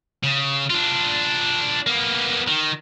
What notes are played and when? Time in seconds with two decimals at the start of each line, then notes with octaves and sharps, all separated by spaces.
0.23 C#3
0.70 D4 F4
1.87 A#3 B3
2.47 D#3